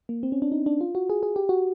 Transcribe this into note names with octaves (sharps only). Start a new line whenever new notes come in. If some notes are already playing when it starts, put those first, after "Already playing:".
A#3
C4
C#4
D4
D#4
D4
F4
F#4
G#4
G#4
G4
F#4